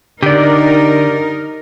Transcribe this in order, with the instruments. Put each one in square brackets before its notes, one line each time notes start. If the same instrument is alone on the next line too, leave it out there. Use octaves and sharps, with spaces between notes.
[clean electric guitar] D3 [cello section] D#4 A#4 [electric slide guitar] G4 D5